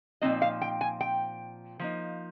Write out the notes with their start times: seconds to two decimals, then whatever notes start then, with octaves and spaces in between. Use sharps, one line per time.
0.21 A#2 F3 C4 D#4 D#5
0.42 F5
0.62 G5
0.81 G#5
1.01 G5
1.79 F3 A#3 D#4